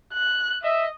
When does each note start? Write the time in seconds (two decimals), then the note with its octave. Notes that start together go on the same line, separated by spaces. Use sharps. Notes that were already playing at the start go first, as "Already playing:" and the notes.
0.14 F#6
0.64 D#5 E5